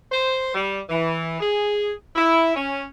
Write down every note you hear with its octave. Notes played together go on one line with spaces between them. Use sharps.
C5
G3
E3
G#4
E4
C#4